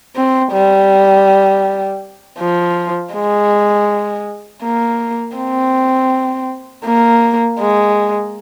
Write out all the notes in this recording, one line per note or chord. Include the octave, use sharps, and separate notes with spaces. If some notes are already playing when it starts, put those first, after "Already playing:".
C4
G3
F3
G#3
A#3
C4
A#3
G#3